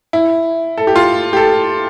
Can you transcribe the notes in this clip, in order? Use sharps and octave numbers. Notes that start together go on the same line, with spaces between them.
E4
A4
G4
F4
G4
A4